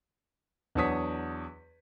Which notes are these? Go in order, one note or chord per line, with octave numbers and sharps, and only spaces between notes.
E2 F#3 D4 C#5 D#6 B6